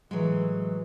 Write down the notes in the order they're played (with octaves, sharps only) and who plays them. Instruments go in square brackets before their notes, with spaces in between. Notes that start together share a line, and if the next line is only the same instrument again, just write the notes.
[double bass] A2 E3 [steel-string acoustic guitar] F#3 G#3